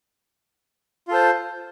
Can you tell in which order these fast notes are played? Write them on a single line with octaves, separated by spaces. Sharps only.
F4 A4 C5